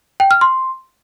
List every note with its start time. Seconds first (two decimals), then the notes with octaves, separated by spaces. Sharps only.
0.20 G5
0.31 F6
0.41 C6